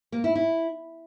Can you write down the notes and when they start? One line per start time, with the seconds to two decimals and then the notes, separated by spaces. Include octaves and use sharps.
0.12 A#3
0.24 E4
0.35 E4